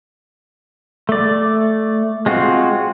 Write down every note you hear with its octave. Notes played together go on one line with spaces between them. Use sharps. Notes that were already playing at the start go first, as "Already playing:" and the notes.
A3 D5
G#3 C4 F4 F#4